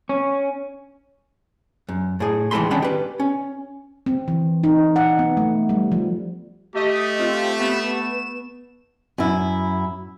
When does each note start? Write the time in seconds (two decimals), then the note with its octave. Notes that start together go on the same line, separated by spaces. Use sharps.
0.09 C#4
1.89 F#2
2.20 A2 G#4
2.51 D#2 E3 G#3 A4 B5 C6
2.71 D#3 G3 C#4 D4 F#5 B5
2.82 G4 B4
3.20 C#4
4.06 C4
4.28 E3
4.64 D#4
4.96 F#5
5.19 B3
5.37 A3
5.69 G3
5.92 F3
6.75 A3 G4 D#5
7.19 C4 F4
7.56 B3 E7
9.18 F#2 E4